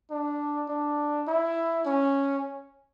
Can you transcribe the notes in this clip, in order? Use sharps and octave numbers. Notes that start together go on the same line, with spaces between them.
D4
D4
E4
C#4